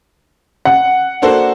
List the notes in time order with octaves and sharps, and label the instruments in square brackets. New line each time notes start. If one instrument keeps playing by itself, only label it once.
[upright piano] F#5
[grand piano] A#3 D4 F#4 A4 C5